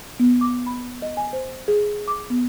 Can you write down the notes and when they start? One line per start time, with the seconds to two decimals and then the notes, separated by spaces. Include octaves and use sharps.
0.20 B3
0.41 D6
0.67 B5
1.02 D#5
1.17 G#5
1.33 C5
1.68 G#4
2.08 D6
2.30 B3